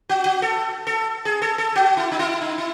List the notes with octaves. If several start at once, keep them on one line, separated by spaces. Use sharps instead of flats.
F#4
F#4
A4
A4
G#4
A4
A4
F#4
E4
D#4
E4
D#4
E4